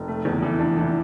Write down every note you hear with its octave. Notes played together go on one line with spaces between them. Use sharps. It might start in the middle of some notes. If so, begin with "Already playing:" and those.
Already playing: F1
A3
E2
E3
D4
E3